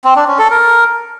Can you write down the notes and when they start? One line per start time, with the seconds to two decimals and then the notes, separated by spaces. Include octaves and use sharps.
0.04 C4
0.16 D4
0.27 C#4
0.39 A4
0.50 A#4